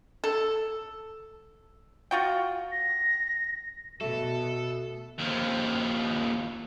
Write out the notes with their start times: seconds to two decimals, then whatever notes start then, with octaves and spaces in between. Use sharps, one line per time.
0.24 A4
2.11 F4 F#4 G5
2.71 A#6
4.01 B2 A3 A4
5.18 D#2 F3